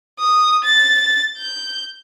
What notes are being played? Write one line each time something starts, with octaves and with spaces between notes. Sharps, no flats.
D#6
A6
G6